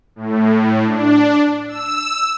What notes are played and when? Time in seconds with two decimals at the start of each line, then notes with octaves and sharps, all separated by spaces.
0.16 A2
0.85 D4
1.67 E6